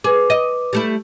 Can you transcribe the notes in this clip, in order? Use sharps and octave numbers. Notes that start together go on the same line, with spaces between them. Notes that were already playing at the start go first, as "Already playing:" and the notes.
G#4 B4 D6
D#5
G3 A3 E4